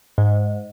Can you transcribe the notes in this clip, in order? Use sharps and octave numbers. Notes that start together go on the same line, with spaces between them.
G#2